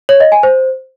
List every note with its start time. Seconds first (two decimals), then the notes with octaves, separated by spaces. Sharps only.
0.09 C#5
0.20 D#5
0.32 G#5
0.43 C5